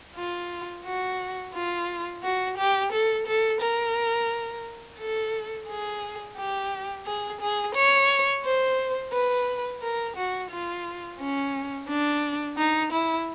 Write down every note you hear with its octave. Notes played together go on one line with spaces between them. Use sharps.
F4
F#4
F4
F#4
G4
A4
A4
A#4
A4
G#4
G4
G#4
G#4
C#5
C5
B4
A#4
F#4
F4
C#4
D4
D#4
E4